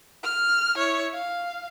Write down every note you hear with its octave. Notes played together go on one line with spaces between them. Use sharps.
F6
E4 C#5
F5